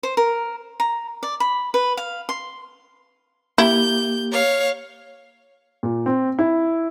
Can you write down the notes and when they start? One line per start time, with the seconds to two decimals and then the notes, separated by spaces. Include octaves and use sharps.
0.03 C5
0.17 A#4
0.80 A#5
1.23 D5
1.40 B5
1.74 B4
1.97 F5
2.29 C6
3.58 A#3 E4 G4 G6
4.31 C#5 F5
5.83 A#2
6.06 C4
6.39 E4